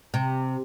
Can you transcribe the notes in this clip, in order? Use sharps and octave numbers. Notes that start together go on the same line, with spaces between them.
C3